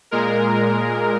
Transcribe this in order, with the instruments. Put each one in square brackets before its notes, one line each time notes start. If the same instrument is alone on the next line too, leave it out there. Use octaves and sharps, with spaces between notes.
[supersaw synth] A#2 G#3 A#4